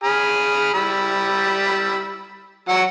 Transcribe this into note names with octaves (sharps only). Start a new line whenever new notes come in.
G#4 B5 F6
G3 B5 E6
F#3 F#5 E6